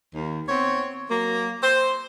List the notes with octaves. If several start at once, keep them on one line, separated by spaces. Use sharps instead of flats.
D#2
B3 C4 C#5
F#3 A#3
C5